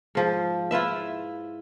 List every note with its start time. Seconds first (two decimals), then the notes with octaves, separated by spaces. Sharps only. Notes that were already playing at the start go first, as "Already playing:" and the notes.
0.15 G#2 F3
0.71 E4 F4 B4 E5